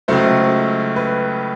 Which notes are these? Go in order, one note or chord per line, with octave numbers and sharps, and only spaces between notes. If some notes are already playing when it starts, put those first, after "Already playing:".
C#2 C#3 F#3 A3 C5
B4